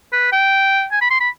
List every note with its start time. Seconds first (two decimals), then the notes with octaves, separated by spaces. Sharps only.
0.13 B4
0.32 G5
0.91 G#5
1.01 B5
1.11 C6
1.20 B5